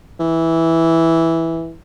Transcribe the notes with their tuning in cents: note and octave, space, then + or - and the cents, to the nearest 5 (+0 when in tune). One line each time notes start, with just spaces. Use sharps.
E3 -5